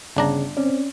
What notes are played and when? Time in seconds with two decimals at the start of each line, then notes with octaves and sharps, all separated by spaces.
0.17 G1 C#3 D4 A#5
0.57 C4 C#4 D5